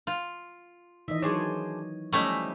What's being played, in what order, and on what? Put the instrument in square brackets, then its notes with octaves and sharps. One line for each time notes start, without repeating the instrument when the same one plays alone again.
[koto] F4
[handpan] D#3 E3 D#5 [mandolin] E5
[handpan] F#3 C#5 [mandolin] D4 G#4 C5
[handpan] F3 C#4 D#5 [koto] G3 A3 E4 [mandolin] C#6